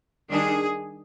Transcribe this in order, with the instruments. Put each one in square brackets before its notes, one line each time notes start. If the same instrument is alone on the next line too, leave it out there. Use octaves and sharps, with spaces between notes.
[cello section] D#3 G3 D4 G#4